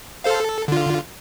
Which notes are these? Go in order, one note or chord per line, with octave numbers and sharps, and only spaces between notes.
A4 C5 F5
A4
D3 F4